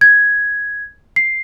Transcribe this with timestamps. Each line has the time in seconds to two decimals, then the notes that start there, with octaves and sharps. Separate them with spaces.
0.01 G#6
1.16 C7